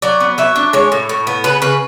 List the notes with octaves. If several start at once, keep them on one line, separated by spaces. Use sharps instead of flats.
F#3 D5
B3
F#3 E5
D4
G#3 C#5
A2
A2
B3
C#3 B4
C#3 B4